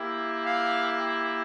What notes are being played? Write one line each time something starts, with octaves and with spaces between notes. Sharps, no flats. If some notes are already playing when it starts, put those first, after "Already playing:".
Already playing: A#3 E4 G4
F5